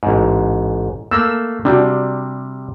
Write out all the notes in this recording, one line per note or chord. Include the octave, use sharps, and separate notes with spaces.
A1 G#2
A3 A#3 E6
C3 G3 D4 F#4